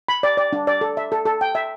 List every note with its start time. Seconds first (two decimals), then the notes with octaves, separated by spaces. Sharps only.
0.08 B5
0.23 D5
0.37 D5
0.53 D4
0.67 D5
0.81 A4
0.97 E5
1.12 A4
1.25 A4
1.41 G5
1.55 E5